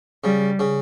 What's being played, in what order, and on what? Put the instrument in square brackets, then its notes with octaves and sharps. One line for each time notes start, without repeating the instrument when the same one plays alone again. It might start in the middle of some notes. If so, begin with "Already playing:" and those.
[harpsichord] C#3 [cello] G3
[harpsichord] C#3